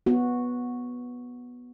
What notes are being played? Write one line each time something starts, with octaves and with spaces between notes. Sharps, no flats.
B3 F#4